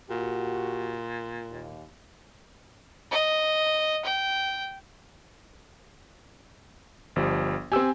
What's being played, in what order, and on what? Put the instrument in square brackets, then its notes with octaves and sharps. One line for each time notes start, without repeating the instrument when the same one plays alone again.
[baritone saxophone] A#2 [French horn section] F#4 G4
[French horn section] D#2
[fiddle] D#5
G5
[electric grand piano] G1 F3 G3
[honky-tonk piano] C4 G4 [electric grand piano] G#5 E6